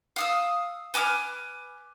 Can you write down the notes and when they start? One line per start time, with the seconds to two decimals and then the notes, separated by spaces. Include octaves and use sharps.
0.16 F5 D#6 E6
0.94 B4 G#5 D6 F6